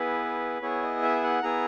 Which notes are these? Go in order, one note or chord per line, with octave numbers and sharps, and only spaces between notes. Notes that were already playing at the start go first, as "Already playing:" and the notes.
Already playing: B3 E4 G#4 B4
B3 E4 G#4 C#5
D#5
E5
F#5
B3 E4 G#4 A#5